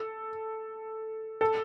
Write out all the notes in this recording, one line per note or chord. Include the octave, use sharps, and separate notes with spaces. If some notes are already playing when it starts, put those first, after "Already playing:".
Already playing: A4
A4